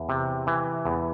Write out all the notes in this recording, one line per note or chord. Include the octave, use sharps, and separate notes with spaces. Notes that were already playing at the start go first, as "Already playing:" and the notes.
Already playing: E2
C3
E3
E2